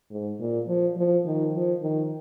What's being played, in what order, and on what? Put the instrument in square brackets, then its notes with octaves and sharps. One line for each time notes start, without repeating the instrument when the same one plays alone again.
[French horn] G#2
A#2
F3
F3
D#3
F3
D#3